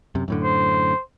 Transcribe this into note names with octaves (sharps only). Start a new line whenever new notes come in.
F#2 C3
F#2 A2 D3
C5